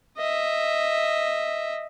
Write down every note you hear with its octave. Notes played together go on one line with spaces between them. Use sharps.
D#5 E5